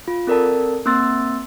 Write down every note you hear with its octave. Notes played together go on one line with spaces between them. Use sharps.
F4
C4 A4 A#4 D5 A5
A#3 C4 C6 E6 A6